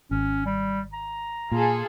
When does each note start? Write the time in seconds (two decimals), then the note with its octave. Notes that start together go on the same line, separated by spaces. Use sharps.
0.11 G#1 C#4
0.46 G3
0.93 A#5
1.51 A#2 F4 G#4 A4